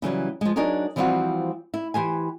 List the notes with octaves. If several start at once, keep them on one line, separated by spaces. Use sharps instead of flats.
C#3 E3 F#3 G3
F3 G#3
F#3 D4 D#4 G#4 A#4 C#5
E3 F3 G3 C4 F4 F#4
E4
E3 G4 C5 G#5